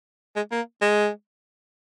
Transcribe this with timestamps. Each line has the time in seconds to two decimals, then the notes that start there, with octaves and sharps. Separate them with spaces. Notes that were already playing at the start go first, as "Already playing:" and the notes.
0.36 G#3
0.52 A#3
0.82 G#3